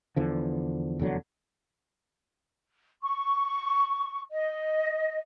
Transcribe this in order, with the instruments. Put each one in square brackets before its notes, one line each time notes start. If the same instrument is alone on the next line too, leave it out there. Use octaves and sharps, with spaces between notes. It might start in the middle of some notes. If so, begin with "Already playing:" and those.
[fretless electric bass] E2 D3 F3
F1 E2 D3 F#3
[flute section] C#6
D#5